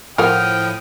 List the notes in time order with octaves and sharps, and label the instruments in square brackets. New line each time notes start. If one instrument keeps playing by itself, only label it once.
[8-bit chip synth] A2 F3 [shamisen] F4 A#4 F#5 [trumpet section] G5 D#6 [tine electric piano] F6